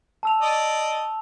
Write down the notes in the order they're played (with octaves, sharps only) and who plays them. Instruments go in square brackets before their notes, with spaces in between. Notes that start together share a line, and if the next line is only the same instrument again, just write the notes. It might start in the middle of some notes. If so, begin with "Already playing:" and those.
[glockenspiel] A5 E6 F7
[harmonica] D5 D#5